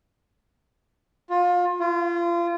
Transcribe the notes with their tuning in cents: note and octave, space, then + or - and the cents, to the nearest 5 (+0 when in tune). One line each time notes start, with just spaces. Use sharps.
F4 +25
F4 -30